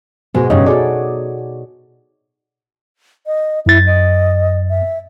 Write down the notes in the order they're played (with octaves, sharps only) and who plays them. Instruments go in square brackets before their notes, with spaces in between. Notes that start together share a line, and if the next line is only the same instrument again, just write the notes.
[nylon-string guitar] G#2 G#3 [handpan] B2 F#4 G#4
[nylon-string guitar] G2 C#3 [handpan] D#4 C#5 D#5
[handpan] F#4 G#4 D5 [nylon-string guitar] A4
[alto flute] D#5
[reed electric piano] F#2 A6 [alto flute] E4
[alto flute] D#5
E5